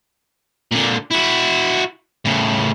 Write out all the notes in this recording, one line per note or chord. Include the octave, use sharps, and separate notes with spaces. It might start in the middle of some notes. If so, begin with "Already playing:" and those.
A#2 D3
E4 F#4
A2 C#3